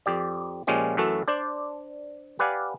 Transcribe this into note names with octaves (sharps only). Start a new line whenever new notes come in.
F2 G4 D5
A#2 F3 G#3 C#4 G4
F#2 E3 A3 F#4 A4 A5
D4 C5 D5
G4 B4 D5 F5 F#5 G#5